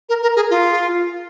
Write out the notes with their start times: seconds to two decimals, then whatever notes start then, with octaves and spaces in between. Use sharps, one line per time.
0.09 A#4
0.22 A#4
0.36 G#4
0.50 F4